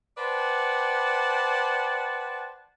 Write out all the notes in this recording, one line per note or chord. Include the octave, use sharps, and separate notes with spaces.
B4 C5 D5 F#5 G5 A5